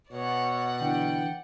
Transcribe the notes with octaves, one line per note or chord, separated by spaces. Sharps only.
B2 C#5 D5 F#5
D3 E3 B3 G5